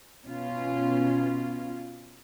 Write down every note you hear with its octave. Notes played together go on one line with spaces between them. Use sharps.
B2 C#4 F4